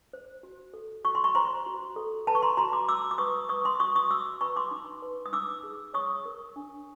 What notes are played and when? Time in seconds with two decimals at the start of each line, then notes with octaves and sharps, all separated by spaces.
0.13 C5
0.43 F#4
0.74 A4
1.04 F#4 C#6
1.15 C6
1.24 B5 C#6
1.35 C5 A#5 C6
1.66 F#4
1.96 A4
2.27 B4 A5 B5
2.35 C#6
2.42 A#5 C6
2.57 F#4 A#5 C6
2.73 C6 D6
2.88 F#4 D6 E6
3.11 D6
3.18 B4 C#6 D#6
3.49 B4 C#6 D#6
3.64 C6 D6
3.80 F#4 C#6 D#6
3.96 C#6 D#6
4.10 F#4 D6 E6
4.41 B4 B5 C#6
4.56 C6 D6
4.71 D#4
5.02 B4
5.26 D#6
5.32 D#4 D6 E6
5.64 G#4
5.94 C#5 C#6 D#6
6.25 A#4
6.56 D4